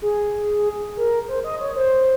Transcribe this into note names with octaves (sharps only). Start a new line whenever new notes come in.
G#4
A#4
C5
D#5
C#5
C5